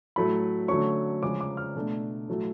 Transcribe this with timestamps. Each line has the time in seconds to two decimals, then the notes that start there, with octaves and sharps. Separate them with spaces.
0.16 A2 F#3 A3 B5
0.68 D3 F#3 A3 C#4 C#6
1.22 C#3 F3 G#3 C#4 D6
1.41 D6
1.57 F6
1.75 B2 A3 D4
2.28 A2 F#3 A3